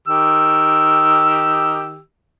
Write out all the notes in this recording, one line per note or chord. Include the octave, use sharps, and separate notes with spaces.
D#3 G4 E6